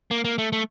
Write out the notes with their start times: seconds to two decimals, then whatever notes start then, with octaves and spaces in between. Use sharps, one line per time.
0.11 A#3
0.25 A#3
0.38 A3
0.52 A3